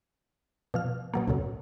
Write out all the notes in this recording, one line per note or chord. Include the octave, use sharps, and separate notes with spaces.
B2 F3 F6
B2 F#3 A#3
C#2 F#2 A2 C#3